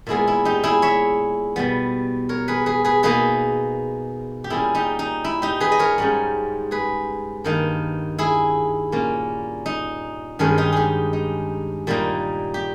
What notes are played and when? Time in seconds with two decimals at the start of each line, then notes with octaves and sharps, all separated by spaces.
0.07 A#2 G#3 B3 E4 G#4
0.27 E4
0.45 D#4 G4
0.64 E4 G#4
0.82 C#5 E5
1.56 B2 G3 B3
2.29 A#4 C#5
2.48 G#4 B4
2.66 G#4 B4
2.85 G#4 B4
3.03 B2 A#3 D#4 G#4 B4
4.44 G4
4.50 A#2 G3 C#4 E4 G#4
4.75 D#4 G4
4.99 D#4
5.24 E4
5.42 D#4 G4
5.60 G#4 B4
5.72 D#5
5.79 A#4 C#5
5.98 G#2 G3 C#4
6.71 G#4 B4
7.44 G2 D#3 A#3 D#4
8.18 E4 G#4
8.92 A#2 A#3 C#4
9.66 D#4
10.39 G2 D#3 G#3 C#4
10.58 D#4 G4
10.72 D#4 G4 G#4
11.13 D#4
11.87 A#2 G3 A#3 D#4
12.54 G4